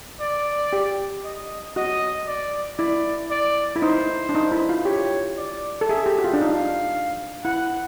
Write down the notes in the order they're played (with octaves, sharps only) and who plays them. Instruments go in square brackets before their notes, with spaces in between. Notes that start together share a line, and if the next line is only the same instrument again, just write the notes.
[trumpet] D5
[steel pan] G4
[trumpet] D#5
[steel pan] F#4 [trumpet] D#5
[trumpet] D5
[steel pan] E4 [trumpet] D5
[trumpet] D5
[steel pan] E4
[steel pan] D#4 [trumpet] C5
[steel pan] D4
D#4
E4
F4
[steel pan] G4 [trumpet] C#5
[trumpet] D5
[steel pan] A4
[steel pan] G#4 [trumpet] E5
[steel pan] G4
F#4
F4
D4
[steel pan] D#4 [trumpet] F5
[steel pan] E4 [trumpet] F#5